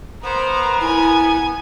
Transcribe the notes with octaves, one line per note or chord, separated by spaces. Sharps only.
B3 A#4 C5
E4 G#5